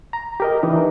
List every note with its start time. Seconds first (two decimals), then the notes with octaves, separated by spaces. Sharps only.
0.13 A#5
0.40 G4 A#4 D#5
0.63 E3 D4 D#4